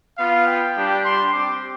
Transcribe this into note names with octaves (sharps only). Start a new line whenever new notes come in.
B3 F4 F5
G5
G3 D4 G4
C6
C4 G4 D6